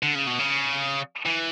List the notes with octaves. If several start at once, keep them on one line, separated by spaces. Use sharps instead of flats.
D3
C#3
B2
C#3
E3